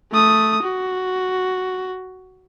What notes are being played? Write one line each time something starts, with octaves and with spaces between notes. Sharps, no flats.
A3 D#6
F#4